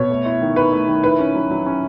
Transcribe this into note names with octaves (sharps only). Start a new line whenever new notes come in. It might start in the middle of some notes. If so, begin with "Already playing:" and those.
Already playing: B2 C#5
A3
E4
D#3
D#3 B4
A3
D#3
E4 B4
C#4
F#3
F#3
C#4